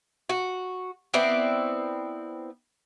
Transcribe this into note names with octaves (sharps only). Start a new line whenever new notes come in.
F#4
B3 C4 E4 D5